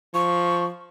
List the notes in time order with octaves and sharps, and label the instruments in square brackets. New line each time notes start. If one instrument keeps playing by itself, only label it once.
[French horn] F3 [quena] C#6